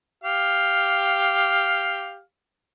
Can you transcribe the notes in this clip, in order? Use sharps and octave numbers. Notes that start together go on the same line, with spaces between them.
G4 F5